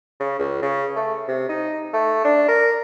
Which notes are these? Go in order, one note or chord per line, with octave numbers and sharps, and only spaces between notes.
C#3
C#2
C#3
A3
C3
D#4
A3
D4
A#4